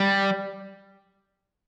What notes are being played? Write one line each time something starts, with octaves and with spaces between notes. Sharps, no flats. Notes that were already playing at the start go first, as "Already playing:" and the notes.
Already playing: G3